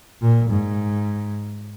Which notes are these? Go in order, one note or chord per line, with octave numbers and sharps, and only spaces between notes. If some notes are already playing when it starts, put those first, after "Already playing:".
A#2
G#2